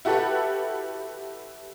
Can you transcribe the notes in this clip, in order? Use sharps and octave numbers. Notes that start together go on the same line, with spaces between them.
E4 F#4 G4 A4 B4 F#5